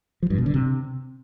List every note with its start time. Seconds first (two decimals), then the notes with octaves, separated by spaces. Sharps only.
0.23 F3
0.30 G2
0.38 B2
0.46 D3
0.54 C3